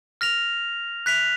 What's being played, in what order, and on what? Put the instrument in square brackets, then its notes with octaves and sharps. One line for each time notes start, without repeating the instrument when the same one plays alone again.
[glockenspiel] F6 A#6 F7
F#6 B6 F7